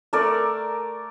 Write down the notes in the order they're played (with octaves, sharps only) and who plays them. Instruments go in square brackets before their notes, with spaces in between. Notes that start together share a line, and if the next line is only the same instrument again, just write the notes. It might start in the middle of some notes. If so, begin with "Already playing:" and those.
[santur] A3 A#4 D5